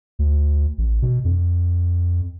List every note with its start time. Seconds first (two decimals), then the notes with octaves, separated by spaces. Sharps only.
0.19 D2
0.78 A1
1.02 B2
1.24 F2